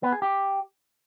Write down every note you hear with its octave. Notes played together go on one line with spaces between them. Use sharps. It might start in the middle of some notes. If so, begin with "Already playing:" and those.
B3
G#4
G4